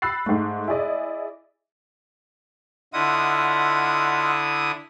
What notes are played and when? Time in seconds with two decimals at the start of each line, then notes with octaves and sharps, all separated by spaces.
0.02 B5 E6 F#6 A6 C7
0.26 G#2 A3
0.68 E4 G#4 D5 D#5
2.93 D3 E4 F4 D#5 F#5 D#6